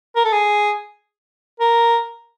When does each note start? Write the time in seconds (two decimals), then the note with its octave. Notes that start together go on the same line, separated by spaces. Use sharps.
0.16 A#4
0.25 A4
0.32 G#4
1.60 A#4